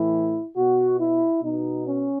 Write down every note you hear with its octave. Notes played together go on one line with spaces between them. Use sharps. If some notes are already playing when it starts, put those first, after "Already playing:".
Already playing: A2 E3 E4
B2 F#4
E4
B2 D#4
C#4